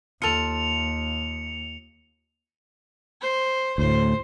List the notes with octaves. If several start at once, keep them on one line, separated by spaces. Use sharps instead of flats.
D#2 F4 A4 C#7 F7
C5
D2 A2 C5